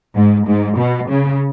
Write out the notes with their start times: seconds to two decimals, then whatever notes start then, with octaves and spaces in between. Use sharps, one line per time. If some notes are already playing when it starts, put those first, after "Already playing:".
0.15 G#2
0.46 G#2
0.77 B2
1.09 C#3